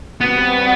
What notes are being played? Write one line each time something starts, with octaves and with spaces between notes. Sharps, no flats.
B2 G3 B3 C4